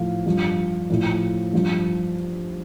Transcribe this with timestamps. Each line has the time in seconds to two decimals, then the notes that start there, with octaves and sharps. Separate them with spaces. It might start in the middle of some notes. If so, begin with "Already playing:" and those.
Already playing: A2 F3 F5
0.26 G2 F3
0.90 A2 F3
1.53 G2 F3